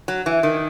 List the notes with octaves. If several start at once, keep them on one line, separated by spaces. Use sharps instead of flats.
F#3
E3
D#3